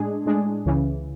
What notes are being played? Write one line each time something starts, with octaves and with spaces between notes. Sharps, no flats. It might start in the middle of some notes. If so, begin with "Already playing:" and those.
Already playing: A2 G#3 D4 G#4
A2 G#3 D4 G#4
C#2 C#3 E3